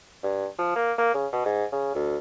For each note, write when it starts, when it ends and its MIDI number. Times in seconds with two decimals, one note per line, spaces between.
0.23 0.47 43
0.58 0.75 53
0.76 0.92 58
0.98 1.14 58
1.14 1.26 49
1.32 1.41 47
1.45 1.65 44
1.72 1.92 49
1.95 2.18 38